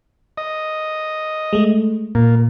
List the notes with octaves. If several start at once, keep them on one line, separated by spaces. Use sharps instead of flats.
D#5
G#3 A3
A#2 A#3